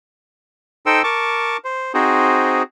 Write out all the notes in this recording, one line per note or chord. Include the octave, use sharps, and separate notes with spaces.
D#4 A4 C5 G5 E6
A#4 A5 C#6 D6
C5
C4 D#4 F#4 G#4 C5